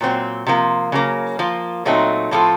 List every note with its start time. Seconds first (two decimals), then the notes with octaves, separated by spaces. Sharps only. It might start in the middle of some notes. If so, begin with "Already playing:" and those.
0.01 A#2 F#3 C4
0.47 C3 F3 A#3
0.92 C#3 F#3 A#3
1.39 F3 A#3 F4
1.85 A#2 F#3 A3 C4 D#4
2.31 A2 F3 C4 F4 A4